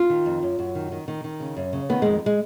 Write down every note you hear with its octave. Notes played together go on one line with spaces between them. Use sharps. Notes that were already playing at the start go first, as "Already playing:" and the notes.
Already playing: F4
D#3
F2
F#2
F#2
D#3
D#3
D#3
D#3
C#3
F#2
C#3
D#3 B3
F2 G#3
G#3